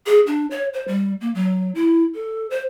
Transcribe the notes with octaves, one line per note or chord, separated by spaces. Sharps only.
G#4
D4
C#5
C5
G3
A#3
F#3
E4
A4
C5